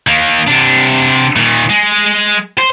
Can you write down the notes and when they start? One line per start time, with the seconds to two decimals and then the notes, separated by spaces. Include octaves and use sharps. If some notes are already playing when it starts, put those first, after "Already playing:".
0.07 D#3 A#3
0.48 C3 D4
1.36 A#2 D#3
1.70 G#3
2.58 C5